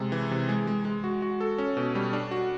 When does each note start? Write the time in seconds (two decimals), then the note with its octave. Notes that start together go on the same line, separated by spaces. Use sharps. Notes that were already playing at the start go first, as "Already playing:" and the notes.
Already playing: C3 G#3
0.12 E3
0.31 C3
0.49 G#3
0.67 G#3
0.85 G#3
1.04 F#4
1.22 F#4
1.40 A4
1.58 C#4
1.77 B2
1.95 G3
2.13 D4
2.31 F#4